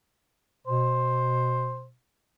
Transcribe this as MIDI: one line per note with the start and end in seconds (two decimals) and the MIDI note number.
0.67 1.93 47
0.67 1.83 72